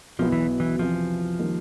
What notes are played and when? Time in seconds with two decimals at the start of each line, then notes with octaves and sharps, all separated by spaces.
0.19 B1 B2 F3 F#3 B3 E4
0.32 E3
0.60 E3
0.79 F2 C3 E3 F3
1.39 D#3 G3 A#3 D#4